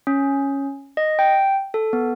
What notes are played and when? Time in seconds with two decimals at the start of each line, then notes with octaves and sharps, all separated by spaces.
0.07 C#4
0.97 D#5
1.19 G5
1.74 A4
1.93 B3